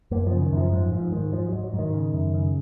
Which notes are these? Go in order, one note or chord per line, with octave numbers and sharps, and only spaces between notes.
F#2 A#3
F3
C#3
D#3
F#2 F3
G#2 F3
G#2 F3
G#2 D#3
G#2 F3
G#2 F#3
F#3
G#2
D#3
C#3
F#2
C#3